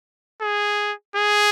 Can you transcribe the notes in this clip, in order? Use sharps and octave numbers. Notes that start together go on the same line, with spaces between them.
G#4
G#4